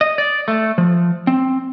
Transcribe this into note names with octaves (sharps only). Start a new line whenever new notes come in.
D#5
D5
A3
F3
C4